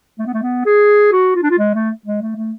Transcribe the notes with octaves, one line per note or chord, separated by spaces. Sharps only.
A3
B3
A3
B3
G#4
F#4
F4
D4
F4
G#3
A3
G#3
A3
A3